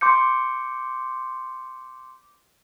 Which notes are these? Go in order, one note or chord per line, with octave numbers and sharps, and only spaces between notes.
C6 D6 G6 C#7